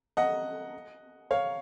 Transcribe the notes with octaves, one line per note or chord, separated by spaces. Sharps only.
D#5 F#5
C#5 F5